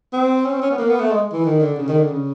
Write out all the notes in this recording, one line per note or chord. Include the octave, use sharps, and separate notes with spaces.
C4
C#4
C4
C#4
B3
A#3
B3
A3
G#3
E3
D#3
D3
C#3
D#3
D3
C#3